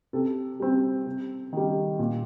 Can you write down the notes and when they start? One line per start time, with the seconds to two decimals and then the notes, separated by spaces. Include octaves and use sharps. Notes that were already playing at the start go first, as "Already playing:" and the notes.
0.13 C3 A4
0.60 G3 C4
1.06 C3
1.53 D#3 G3
1.99 A#2